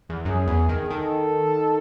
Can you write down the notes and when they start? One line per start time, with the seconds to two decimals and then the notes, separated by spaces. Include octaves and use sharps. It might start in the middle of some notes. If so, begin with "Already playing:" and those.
0.09 E2
0.25 F#2 G#4
0.48 E2
0.69 D#3
0.90 D#3 A4